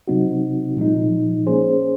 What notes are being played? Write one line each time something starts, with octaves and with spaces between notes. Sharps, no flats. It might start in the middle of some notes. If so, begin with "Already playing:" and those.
C3 F#3 C4 D#4 F#4
A#2 F3 G#3 D#4
A#3 C#4 G#4 C5